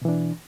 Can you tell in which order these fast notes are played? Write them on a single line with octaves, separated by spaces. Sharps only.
B2 E3 D4